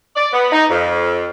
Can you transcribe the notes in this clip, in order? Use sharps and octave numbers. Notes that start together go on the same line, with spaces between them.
D5
B3
D#4
F2